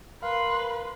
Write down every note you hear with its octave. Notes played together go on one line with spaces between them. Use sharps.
A#4 B4 F5 C6